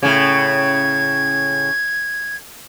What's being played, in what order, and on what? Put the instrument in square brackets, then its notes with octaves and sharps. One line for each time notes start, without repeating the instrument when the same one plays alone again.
[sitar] A2 C#3 [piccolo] G#6